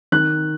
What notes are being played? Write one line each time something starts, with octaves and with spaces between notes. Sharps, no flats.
D#3 F#6